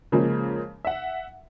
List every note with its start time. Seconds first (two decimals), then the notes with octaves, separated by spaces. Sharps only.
0.12 C#3 F3 G#3 A#3
0.85 E5 F#5